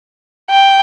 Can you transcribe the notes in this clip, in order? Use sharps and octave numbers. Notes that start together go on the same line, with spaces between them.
G5